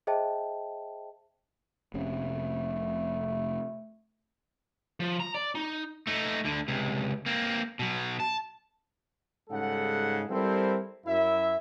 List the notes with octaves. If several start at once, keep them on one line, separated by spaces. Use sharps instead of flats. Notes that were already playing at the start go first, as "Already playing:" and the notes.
G#4 C5 D#5 E5 G5 A5
F1 C3 A3 C#4
F3
A#5
D5
D#4
A3 D#4
D2 D3
C#2 C3
A#3 C4
B2 F#3
A5
G#2 C#3 G3 A4 F#5
G3 C4 E4 A4 A#4 C5
F#2 E4 E5